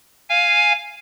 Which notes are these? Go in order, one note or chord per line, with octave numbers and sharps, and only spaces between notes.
F5 G#5